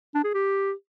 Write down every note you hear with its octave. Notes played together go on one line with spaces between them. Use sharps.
D4
G#4
G4